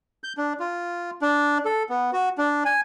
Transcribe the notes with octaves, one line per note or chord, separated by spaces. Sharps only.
G6
D4
F4
D4
A4
B3
F#4
D4
G#5